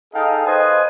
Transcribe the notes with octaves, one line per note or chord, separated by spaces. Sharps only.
D#4 G#4 A4 D#5 F5 G5
B4 C5 D#5 F5 G#5 D#6